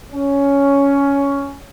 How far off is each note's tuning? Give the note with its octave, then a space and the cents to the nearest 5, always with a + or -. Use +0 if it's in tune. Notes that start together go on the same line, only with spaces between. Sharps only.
C#4 +10